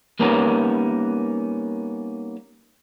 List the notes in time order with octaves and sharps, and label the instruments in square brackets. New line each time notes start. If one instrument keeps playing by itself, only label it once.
[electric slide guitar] G3 A#3 B3 C#4 D#4 A#4